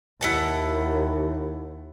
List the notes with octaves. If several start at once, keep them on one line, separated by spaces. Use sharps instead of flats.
D#2 E4 F#5 A5